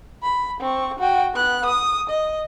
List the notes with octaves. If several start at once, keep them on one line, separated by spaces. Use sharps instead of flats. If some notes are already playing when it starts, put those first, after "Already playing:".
B5
C4 C#6
F#4 G5
B3 F#6
D#6
D#5